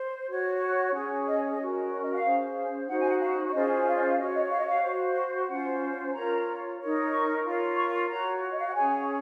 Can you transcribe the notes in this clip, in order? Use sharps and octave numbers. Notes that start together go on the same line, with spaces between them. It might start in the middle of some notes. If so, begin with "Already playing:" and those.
Already playing: C5
F#4 C#5
F#5
C#4 G#4 C#5
D#5
C#5
D#5
C#4 F#4 A#4
C#5
D#5
F5
C#4 G#4 C5
D#4 F#4 C5 F#5
G#5
F#5
F5
C#5
C#4 F4 G#4 C5 D#5
F5
D#5
F5
F#4 C#5 D#5
D#5
F5
D#5
F5
F#4 C5
C#4 F4 C5 F#5
F4 A#4 C#5 A#5
D#4 A#4 C#5
C#6
F4 A#4 C#5
C#6
F#4 C#5 A#5
D#5
F5
F#5
C#4 G#4 C#5 G#5